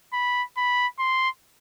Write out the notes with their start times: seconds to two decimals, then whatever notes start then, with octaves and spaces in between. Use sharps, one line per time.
0.13 B5
0.57 B5
0.99 C6